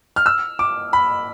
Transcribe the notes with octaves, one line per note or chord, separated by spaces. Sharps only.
F6
E6
D6
B5